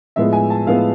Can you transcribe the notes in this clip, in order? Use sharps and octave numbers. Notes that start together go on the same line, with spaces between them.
A2 F3 G#3 B3 E5
G#5
A5
A2 F3 G#3 B3 F5